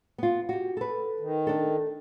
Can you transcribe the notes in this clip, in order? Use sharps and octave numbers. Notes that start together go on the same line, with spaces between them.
B3 F4
F#4 G4
A4 B4
D#3
D4 A4